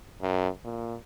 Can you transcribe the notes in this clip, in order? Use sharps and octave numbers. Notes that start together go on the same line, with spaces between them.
F#2
A#2